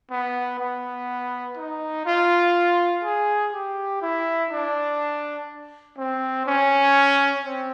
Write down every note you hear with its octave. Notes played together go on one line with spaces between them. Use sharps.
B3
B3
D#4
F4
G#4
G4
E4
D4
C4
C#4
C4